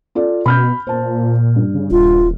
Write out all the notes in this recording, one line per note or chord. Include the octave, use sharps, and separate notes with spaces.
F4 A4 D5
B2 B5 F6 G6
A#2 C5 A5
G2
C#3
D#1 F4